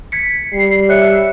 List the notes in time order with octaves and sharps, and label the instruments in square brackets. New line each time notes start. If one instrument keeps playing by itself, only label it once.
[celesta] G#6 B6 C#7
[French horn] G3 [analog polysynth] C7
[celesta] C#5 F#6 C#7 [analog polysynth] E5